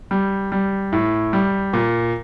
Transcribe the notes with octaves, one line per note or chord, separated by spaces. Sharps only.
G3
G3
A2
G3
A#2